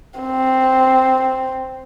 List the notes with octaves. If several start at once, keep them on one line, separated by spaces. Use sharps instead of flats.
C4